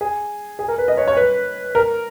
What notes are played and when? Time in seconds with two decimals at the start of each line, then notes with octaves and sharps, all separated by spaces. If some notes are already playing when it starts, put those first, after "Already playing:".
0.01 G#4
0.59 G#4
0.68 A#4
0.78 B4
0.88 D#5
0.97 C#5
1.08 C#5
1.17 B4
1.75 A#4